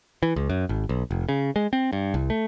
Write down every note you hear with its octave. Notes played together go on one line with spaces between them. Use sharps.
E3
C#2
F#2
G#1
B1
F1
C#3
G#3
C4
G2
C2
A3